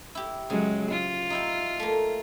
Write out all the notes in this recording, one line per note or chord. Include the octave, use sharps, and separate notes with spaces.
E4 G4
C#3 F#3 G#3
F4
D#4 E4 G5
A3 A#3